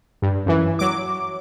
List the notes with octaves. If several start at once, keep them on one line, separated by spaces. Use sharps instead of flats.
G2
F#2 E3
F#3 D6